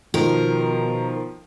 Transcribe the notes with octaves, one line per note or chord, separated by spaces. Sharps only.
B2 D#3 F3 A#4